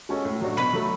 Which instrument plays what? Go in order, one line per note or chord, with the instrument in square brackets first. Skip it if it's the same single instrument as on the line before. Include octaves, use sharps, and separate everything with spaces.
[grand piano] G#3 C#4 F#4 A4
A2
F#3 A3 D4 F#4
[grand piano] B2 [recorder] B5
[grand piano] F#3 A3